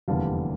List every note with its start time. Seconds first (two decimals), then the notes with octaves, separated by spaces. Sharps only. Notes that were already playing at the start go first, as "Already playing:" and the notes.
0.08 F1 E2 D3 G3 A#3 F5 A5